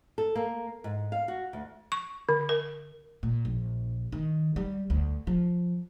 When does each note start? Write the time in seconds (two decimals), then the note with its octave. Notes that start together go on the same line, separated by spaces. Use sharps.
0.18 A4
0.35 A#3
0.84 G#2
1.12 F5
1.28 F#4
1.53 D2
1.92 C#6
2.29 D3
2.49 A#4
3.23 A#2
3.45 A#1
4.12 D#3
4.56 G3
4.90 D2
5.27 F3